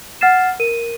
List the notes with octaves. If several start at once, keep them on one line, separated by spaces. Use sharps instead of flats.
F#5 F6 A6 C7 E7
A#4 D#7